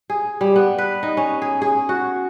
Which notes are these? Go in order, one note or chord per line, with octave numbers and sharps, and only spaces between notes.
G#4
G3
B3
B4
D#4
C#4
G#4
G#4
F#4